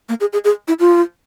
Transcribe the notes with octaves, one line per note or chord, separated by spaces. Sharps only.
A#3
G#4
G#4
G#4
E4
F4